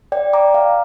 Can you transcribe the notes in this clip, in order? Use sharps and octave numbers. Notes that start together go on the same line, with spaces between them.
D5 G5
A#5 D6
F5 A#5